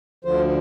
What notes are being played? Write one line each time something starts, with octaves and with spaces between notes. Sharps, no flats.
D2 D3 F3 C5